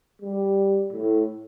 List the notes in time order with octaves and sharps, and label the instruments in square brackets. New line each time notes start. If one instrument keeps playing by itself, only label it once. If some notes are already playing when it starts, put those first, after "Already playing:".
[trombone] G3
A2